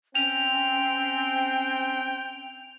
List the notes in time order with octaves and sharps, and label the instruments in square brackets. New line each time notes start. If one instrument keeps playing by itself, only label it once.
[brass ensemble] C4 [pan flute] C#4 [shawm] G5 [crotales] F7